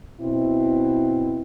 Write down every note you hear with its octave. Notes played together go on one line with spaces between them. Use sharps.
B2 C4 E4